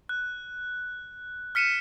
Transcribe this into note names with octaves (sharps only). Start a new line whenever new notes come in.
F#6
F6 B6 C#7 D#7 E7